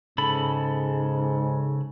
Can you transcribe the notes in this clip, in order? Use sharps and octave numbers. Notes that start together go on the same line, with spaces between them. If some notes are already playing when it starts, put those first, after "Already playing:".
G#2 C#3 A4 B5